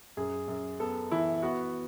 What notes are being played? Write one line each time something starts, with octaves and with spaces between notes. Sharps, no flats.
F#2 G#4
F#2
B3 A4
E3 E4
B3 F#4